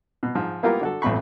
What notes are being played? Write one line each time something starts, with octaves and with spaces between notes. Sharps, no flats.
B2
G#2 F3
A#3 B3 E4 F4 G4 A#4
D3 F#4 A4
A1 F2 B2 B5 C#6